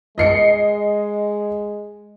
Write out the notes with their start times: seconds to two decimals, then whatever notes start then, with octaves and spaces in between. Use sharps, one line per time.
0.18 G#3 D#5 C7 C#7